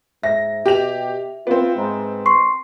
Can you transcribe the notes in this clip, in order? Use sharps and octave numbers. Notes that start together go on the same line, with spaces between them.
G#2 E5 A#6
B2 G4 F7
B3 C4 F4
G#2
C6 C#6 C7